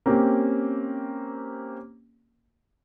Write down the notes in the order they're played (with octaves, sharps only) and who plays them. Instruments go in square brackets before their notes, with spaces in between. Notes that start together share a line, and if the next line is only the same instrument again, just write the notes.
[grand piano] A#3 C4 C#4 G4